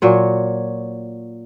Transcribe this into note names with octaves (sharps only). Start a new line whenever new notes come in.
A#2 F#3 C#5